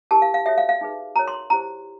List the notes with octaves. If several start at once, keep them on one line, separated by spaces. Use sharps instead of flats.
E4 G4 A#4 A5
F5
F5
F#4 A4 C#5 E5
F5
F5
D#4 G#4 B4
F#4 A#4 C#5 A#5
C6
E4 G4 C5 A#5